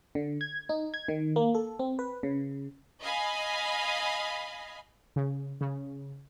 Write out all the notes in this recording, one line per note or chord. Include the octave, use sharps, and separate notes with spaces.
D3
G#6
D#4
G#6
D#3
A#3
A4
C4
B4
C#3
D#5 F5 G#5 B5
C#3
C#3